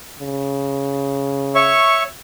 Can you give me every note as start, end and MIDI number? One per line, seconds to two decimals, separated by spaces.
0.19 1.78 49
1.55 2.03 73
1.55 2.03 76
1.55 2.03 85